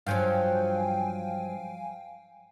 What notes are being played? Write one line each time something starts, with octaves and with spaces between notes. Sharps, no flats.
G2 F3 F#3 F5 G5 G#5